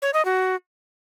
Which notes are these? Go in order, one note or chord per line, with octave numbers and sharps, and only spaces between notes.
C#5
D#5
F#4